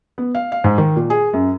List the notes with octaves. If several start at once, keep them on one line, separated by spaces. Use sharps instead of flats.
B3
F5
F5
G#2
D#3
A#2
G#4
F#2